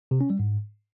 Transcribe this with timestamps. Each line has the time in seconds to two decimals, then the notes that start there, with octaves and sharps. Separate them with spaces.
0.11 C3
0.21 C#4
0.30 G3
0.39 G#2